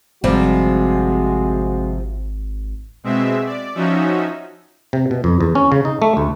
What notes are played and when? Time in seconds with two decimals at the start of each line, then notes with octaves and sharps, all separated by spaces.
0.24 G#1 C3 F3 G3 G#3 F#4
3.04 B2 G#3 C4 E5
3.46 D5
3.75 F3 C#4 D#4 F#4 E5
4.93 C3
5.11 B2
5.24 F2
5.41 E2
5.55 C#4
5.72 C#3
5.85 D#4
6.02 A3
6.17 D2